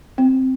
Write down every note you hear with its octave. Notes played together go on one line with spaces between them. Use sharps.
C4